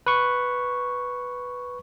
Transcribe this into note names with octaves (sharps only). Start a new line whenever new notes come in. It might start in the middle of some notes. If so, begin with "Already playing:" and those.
B4 C#6